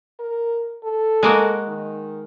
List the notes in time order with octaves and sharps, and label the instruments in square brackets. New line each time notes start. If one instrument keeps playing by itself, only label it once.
[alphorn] A#4
A4
[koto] G#3 A#3 F#4
[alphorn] D#3